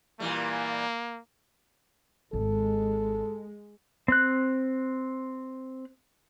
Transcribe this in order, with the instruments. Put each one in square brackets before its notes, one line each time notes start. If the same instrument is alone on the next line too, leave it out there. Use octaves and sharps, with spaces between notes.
[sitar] A#2 E3 G3 [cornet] A#3
[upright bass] G#1 [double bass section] G#3 [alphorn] A4
[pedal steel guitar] C4 F#6